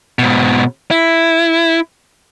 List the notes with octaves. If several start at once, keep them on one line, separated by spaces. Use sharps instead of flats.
G#2 B2
E4